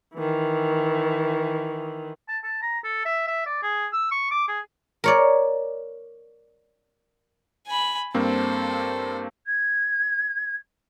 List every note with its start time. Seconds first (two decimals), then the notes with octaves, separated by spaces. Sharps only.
0.15 D#3 E3
2.29 A5
2.44 A5
2.62 A#5
2.84 A4
3.05 E5
3.28 E5
3.46 D5
3.63 G#4
3.93 E6
4.12 C#6
4.31 D6
4.48 G#4
5.04 A#4 C#5 D5
7.67 G#5 B5
8.14 G2 A#3 C4 A4 C5
9.46 G#6